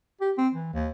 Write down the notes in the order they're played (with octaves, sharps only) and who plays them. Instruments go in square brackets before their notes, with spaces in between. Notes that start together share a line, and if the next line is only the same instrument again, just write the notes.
[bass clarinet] G4
C4
E3
D#2